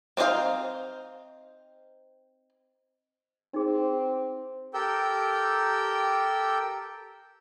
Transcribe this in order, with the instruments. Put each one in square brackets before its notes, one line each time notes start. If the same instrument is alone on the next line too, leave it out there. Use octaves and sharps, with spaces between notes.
[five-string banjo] C4 D4 D#4 C5 F5
[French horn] C4 [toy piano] D#4 G#4
[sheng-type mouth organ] G4 A4 A#4 G5 E6 G6